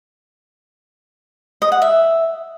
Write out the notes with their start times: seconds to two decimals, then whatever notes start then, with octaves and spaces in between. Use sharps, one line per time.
1.62 D#5
1.72 F#5
1.82 E5